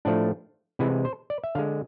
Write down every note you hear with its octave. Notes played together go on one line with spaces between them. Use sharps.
A2 F3 A3 D4
C3 E3 G#3 E4
C5
D5
E5
D3 G#3 F5